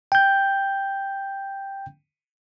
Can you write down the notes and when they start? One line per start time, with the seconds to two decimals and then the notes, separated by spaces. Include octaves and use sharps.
0.12 G5 G6